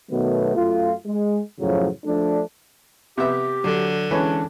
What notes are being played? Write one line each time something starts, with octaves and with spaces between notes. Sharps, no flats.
B2 D#3 F#3 A3 B3
F#2 A3 F4
G#3
F#2 A2 C#3 F3 F#3
F3 A3 D4
C3 B3 G4 E5
D3 F#3
E3 G#3 C#4 D4 B4 C#5